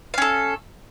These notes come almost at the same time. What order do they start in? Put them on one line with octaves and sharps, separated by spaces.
F5 C#4 A4